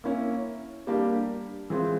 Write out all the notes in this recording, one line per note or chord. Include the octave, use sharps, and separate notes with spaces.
A#3 C#4 E4
G3 A#3 D4 G4
E3 G#3 C4 F4